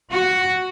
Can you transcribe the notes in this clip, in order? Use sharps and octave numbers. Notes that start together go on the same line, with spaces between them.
F#4